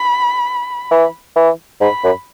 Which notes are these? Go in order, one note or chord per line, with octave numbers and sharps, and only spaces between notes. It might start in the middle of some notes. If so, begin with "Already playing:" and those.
Already playing: B5
E3
E3
G#2 B5
F#2